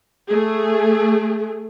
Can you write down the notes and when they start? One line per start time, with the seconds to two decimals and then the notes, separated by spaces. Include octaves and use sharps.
0.28 A3 G#4